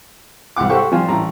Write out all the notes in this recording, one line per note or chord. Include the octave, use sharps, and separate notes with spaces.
C2 G#3 F#5 D6
G4 A4 C5 F#5 G5 C#6
F3 G3 F4 G#5
A1 G3 A#5